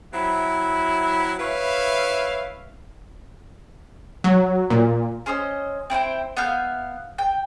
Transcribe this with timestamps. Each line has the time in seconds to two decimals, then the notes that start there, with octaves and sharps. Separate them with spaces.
0.13 F#3 C4 E4
1.39 E4 B4 C#5 E5 F5
4.24 F#3
4.70 A#2
5.26 C#4 C5 D#5 E6
5.90 C4 E4 C5 G5
6.37 B3 E5 F5 G6
7.18 G5